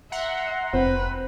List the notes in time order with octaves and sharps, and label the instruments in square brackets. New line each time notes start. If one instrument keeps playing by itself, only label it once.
[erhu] E5 [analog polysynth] F#5 A#5 C6
[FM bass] F1 [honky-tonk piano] C4 [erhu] B4